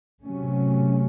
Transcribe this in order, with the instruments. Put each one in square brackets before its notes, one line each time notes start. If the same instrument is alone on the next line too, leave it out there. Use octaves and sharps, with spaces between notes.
[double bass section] C3 F#3 A3 C#4